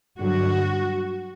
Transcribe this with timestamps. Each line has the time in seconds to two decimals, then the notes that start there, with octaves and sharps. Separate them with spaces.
0.18 G2 D3 F#3 F#4